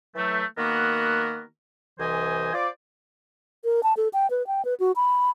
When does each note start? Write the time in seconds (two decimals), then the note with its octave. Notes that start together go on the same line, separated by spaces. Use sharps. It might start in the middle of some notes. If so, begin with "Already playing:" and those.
0.16 E3 F#3 A3
0.58 D#3 A#3 B3 F#4 A#4
1.99 C2 E3 C5 D#5 G#5
2.54 F4 C5 D5
3.64 A#4
3.83 A5
3.97 A4
4.13 G5
4.30 B4
4.47 G5
4.65 B4
4.80 F#4
4.96 B5